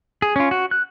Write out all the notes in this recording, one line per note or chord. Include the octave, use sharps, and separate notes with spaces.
G#4
C#4 F4
F#4
F#6